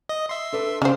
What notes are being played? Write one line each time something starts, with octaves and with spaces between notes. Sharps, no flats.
D#5
E5 C6
D4 A4 B4
C#3 C#4 A#4 C5 D5 F5